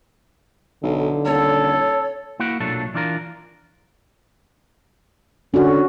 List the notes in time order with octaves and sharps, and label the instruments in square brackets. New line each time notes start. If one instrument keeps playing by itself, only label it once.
[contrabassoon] B1 [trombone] D3
[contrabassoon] D#1 [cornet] A4 [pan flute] C#5
[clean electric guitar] A#3 E4 F#4 F#5
B1 A#2 F#3 A3 D4 A4
E3 D4 F4 A#4
[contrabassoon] D3 [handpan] C#4 F#4